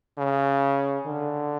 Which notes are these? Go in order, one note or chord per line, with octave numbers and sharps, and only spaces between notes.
C#3
D3